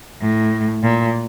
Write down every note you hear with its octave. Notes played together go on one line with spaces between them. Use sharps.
A2
A#2